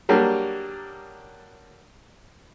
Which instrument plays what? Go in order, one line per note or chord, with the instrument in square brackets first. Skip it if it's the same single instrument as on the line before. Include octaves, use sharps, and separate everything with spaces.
[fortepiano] F#3 G3 A#3 D4 G4 G#4